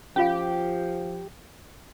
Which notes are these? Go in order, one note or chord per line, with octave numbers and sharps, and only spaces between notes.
F3 C#4 F4 G4 F5